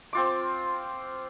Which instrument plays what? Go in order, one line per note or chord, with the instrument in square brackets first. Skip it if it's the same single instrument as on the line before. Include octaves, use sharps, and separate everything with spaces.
[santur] C4 F4 D6